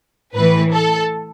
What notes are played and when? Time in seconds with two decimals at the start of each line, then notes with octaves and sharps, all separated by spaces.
0.35 A2 E3 B4
0.72 A4